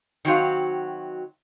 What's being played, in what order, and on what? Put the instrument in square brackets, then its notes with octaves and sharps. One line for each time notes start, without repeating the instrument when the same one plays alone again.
[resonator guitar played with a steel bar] D#3 F#3 C4 F#4 F5